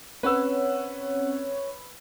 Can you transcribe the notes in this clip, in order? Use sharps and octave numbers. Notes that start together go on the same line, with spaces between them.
C4 C#4 B4 C#5 F#5 E6